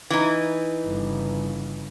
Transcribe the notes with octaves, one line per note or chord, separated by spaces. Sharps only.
E3 D#4
G1 C#3